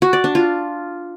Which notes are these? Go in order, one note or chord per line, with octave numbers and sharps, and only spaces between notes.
F#4
D5
D4
F4